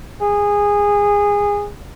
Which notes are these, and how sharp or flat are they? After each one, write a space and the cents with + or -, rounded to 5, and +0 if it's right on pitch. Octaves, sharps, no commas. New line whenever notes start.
G#4 -20